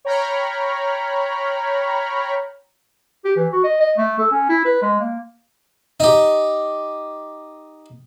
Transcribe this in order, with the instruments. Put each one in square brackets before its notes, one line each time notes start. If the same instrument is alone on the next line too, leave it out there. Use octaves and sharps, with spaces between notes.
[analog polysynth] C#5 G5 A#5 B5 C#6 F6
[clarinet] G4
E3
F#4
D#5
D#5
A3
A4
C#4
E4
B4
G#3
A#3
[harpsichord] D#4 G4